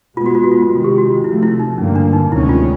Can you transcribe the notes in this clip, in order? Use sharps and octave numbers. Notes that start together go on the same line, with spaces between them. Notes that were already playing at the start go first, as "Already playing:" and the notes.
B2 G#3 B3 F4
F#4
F4
F#4
F4
F4
C3 D#3 G#3 F#4
G4
F#4
F4
C3 F3 A3 E4
E4
D#4
G2 D3 F3 A#3 C#4
D4
D#4
D2 C3 D#3 G#3 C#4 E4
F4